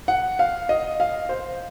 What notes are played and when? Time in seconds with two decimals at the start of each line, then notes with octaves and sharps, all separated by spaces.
0.08 F#5
0.39 F5
0.69 D#5
1.00 F5
1.29 C5